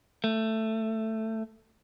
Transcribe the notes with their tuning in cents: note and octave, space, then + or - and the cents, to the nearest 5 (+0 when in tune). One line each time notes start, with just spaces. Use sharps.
A3 +10